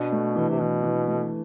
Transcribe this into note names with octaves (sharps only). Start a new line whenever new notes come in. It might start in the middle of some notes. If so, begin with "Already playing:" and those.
Already playing: B2 D4
A3
E3
C3
B2 E3
E3
A3